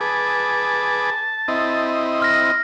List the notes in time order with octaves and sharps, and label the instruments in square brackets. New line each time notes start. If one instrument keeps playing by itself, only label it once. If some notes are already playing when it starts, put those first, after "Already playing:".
[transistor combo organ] G#4 B4 D6 [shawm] A5
[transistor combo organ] C4 E4 D#5
[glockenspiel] C6 F6 A#6